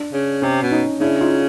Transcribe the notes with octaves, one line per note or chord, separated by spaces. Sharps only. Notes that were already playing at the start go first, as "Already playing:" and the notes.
Already playing: D4
C#3
C3 C#4
B2
C#4 D#4
C#3 D4 E4
D#4 F4